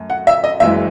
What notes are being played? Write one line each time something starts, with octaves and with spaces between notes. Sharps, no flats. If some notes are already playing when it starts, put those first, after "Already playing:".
Already playing: F#2 A3
F#5
E5
D#5
F#1 F#2 E3 G#3 E5